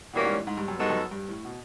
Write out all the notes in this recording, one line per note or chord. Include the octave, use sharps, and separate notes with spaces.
B2 E3 G3 A#3 C#4
G#2
A2
G#2
G2
F#2
G2 G#3 B3 D#4 F#4 A4
F#2
G2
A2
B2